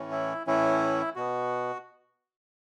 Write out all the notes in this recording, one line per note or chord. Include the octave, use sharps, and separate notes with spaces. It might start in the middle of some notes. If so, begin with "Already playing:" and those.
Already playing: A2 E3 C#4
E4
A2 E3 C#4 E4
B2 B3 F#4